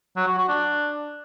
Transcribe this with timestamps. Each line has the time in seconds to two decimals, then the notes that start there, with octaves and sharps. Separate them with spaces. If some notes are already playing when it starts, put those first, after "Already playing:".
0.16 F#3
0.27 F#4
0.38 F#4
0.48 D4